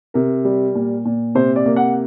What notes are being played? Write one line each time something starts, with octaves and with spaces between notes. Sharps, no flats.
C3 A#4
G3
A#2
A#2
C3 C5
D5
A#3
F#5